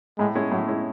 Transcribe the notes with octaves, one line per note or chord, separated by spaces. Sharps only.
A2 G#3
G#3 C#4 E4
A2 F#3
G#3 C#4 E4